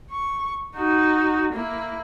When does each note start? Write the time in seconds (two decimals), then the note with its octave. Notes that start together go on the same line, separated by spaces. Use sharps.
0.11 C#6
0.76 D#4 F#4
1.53 A#3 E4